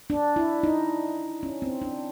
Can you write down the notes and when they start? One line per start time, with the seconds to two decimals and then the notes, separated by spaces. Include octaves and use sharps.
0.10 D4
0.36 E4
0.63 D#4
1.43 C#4
1.62 C4
1.82 D4